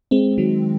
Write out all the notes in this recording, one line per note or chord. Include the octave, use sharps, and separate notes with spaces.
G#3 C4
D#3 F#3